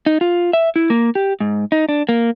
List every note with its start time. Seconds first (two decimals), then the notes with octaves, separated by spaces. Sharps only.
0.06 D#4
0.21 F4
0.53 E5
0.76 E4
0.90 A#3
1.15 G4
1.40 G#2
1.72 D#4
1.89 D4
2.09 A#3